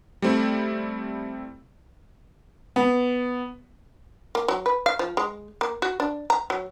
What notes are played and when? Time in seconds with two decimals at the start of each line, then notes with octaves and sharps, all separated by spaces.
0.22 G3 A3 C4 E4
2.76 B3
4.35 A#3
4.48 F#3
4.66 B4
4.86 F5
4.99 F3
5.17 G#3
5.61 A#3
5.82 F#4
6.00 D4
6.30 A#5
6.50 F#3